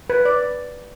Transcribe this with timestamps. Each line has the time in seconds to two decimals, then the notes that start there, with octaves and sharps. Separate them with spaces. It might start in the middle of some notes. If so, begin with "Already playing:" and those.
0.10 B4
0.25 D5